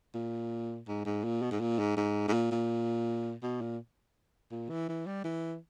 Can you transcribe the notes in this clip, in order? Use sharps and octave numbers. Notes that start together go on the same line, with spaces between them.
A#2
G#2
G#2
A#2
B2
G#2
A#2
G#2
G#2
G#2
A#2
A#2
B2
A#2
A#2
E3
E3
G3
E3